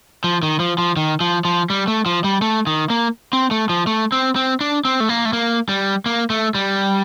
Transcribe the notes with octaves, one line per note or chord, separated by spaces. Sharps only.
F3
D#3
F3
F3
D#3
F3
F3
G3
A3
F3
G3
A3
D#3
A#3
C4
A3
F3
A3
C4
C4
D4
C4
A3
A#3
A3
A#3
G3
A#3
A3
G3